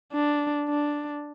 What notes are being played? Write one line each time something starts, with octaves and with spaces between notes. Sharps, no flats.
D4
D4